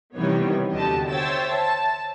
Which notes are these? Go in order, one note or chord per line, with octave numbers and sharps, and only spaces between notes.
C3 D#3 E3 G3 B3 C#5
D#2 D3 F#4 G4 D#5 A5
C5 C#5 E5 G5 E6 A6
A5